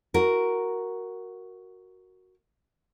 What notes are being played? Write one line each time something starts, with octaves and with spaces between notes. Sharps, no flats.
F#4 A#4